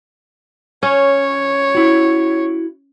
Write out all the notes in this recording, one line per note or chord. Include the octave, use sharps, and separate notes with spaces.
C#4 C#5
E4 F#4